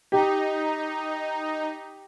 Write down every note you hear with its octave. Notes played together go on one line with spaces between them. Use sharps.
D#4 G4